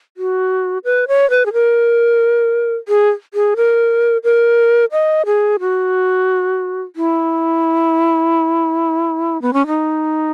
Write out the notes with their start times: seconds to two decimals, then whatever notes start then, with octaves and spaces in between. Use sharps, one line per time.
0.17 F#4
0.85 B4
1.08 C#5
1.30 B4
1.46 G#4
1.53 A#4
2.88 G#4
3.34 G#4
3.57 A#4
4.24 A#4
4.92 D#5
5.26 G#4
5.60 F#4
6.96 E4
9.42 B3
9.53 C#4
9.67 D#4